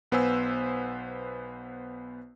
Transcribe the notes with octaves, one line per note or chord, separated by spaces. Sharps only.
B1 B3 B4 C5 G#5 E6